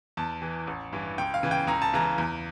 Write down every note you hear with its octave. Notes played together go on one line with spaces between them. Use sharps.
E2 A5
E3
A1
G2 E3
C#2 G5
F5
C#3 E3
G5
C#2 A#5
A5
C#3 E3 A#5
E2